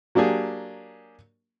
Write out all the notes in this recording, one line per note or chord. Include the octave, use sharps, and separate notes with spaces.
F#3 A#3 D4 G4 G#4